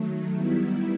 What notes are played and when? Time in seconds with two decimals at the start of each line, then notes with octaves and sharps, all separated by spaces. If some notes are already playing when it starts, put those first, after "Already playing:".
Already playing: D#3 F#3 A3
0.34 D#3 G3 B3 E4